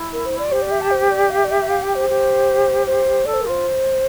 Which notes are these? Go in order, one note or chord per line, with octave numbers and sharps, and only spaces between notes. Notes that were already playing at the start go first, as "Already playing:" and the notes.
Already playing: E4
A#4
C5
D5
G4 C5
D5
E5
A5
C5
D5
F5
E5
D5
E5
E5
F5
G5
C5
G4
C5
A4 D5
C5
A#4
F4 C5